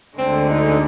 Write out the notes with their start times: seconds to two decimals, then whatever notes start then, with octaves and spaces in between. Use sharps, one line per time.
0.17 D2 D3 G#3 C4
0.50 D#4